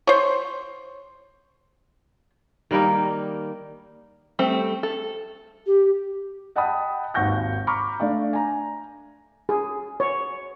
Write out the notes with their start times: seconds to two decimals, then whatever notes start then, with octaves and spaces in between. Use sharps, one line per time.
0.07 C5 C#5
2.71 D#3 G3 A#3 D#4
4.39 G3 A3 C4
4.83 A4
5.67 G4
6.56 D#5 F#5 G5 A5 B5 D#6
7.14 G#1 D#2 F#5 C#6 G6 A#6
7.67 A#5 B5 C#6 D6 F6
8.00 A3 D4 D5 F5
8.33 G#5 A#5
9.49 G#4
10.00 C#5